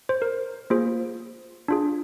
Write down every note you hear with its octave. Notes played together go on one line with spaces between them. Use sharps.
C5
A#4
A#3 F4 G#4 C5
D4 F4 G#4